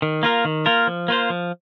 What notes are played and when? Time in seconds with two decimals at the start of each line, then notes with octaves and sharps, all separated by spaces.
0.02 D#3
0.23 A#3 F4 A#4
0.45 D#3
0.66 A#3 F4 A#4
0.87 F3
1.08 A#3 F4 C5
1.30 F3